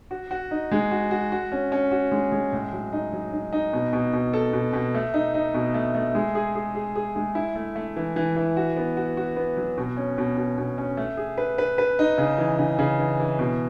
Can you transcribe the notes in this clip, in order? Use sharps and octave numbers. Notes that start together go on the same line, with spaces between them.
F#4
F#4
D#4
G#3
F#4
F#4
F#4
C#4
C#4
F#4
G#3
G#3
A2
F#3
D#4
F#3
D#4
D#4
B2
B2
B2
A4
B2
B2
A3
D#4
D#4
B2
A3
A3
G#3
G#4
G#4
G#4
G#4
G#3
E4
A3
A3
E3
E3
E3
F#4
B3
F#4
F#4
B3
F#3
B2
C#4
B2
B2
B2
C#4
A3
G#4
B4
B4
B4
D#4
C#3
E3
C#3
C#3
E3
E3
B2